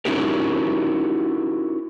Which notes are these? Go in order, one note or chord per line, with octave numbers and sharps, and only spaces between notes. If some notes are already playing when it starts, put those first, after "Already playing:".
C#4 D#4 E4 F#4 G4 A#4